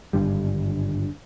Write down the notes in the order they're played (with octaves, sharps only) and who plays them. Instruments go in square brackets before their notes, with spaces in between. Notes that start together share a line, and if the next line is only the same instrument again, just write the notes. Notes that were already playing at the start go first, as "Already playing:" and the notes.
[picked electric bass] G#1 G2 D3 G3